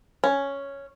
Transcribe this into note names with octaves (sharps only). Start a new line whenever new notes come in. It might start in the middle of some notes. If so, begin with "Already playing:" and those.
C#4